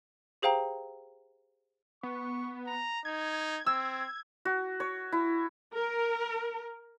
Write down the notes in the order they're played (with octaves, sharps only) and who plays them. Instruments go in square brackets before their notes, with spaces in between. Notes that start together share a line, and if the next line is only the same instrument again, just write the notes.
[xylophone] G4 G#4 C5 F5 G5 A#5
[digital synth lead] B3 [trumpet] C#6
[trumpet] A#5
[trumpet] D#4 [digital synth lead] G#6
[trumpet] C4 [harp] E6
[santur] F#4
C#5
E4
[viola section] A#4